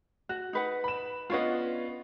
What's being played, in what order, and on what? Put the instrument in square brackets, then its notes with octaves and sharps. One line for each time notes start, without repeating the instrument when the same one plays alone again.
[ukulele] F#4 [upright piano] F#6
[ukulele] D#4 B4 F#5
[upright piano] B5 E7
[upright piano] B3 C#4 F4 [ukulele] D4 C#5 D#5